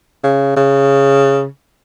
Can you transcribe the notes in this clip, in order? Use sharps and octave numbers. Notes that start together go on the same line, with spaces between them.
C#3
C#3